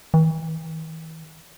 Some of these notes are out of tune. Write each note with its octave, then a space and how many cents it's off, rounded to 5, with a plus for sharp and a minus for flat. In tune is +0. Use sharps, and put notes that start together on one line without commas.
E3 -45